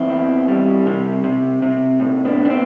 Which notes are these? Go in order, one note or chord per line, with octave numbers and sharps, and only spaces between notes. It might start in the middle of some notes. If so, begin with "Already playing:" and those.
Already playing: E2 C4 E4
E3
G3
C3
C3
C3
A2
B3 D4
A2
D4
C4